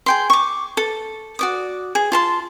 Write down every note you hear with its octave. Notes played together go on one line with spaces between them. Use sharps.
G#4 G5 C6
C#6 D6
A4
F#4 D5 D#6
G#4
F4 A5 C6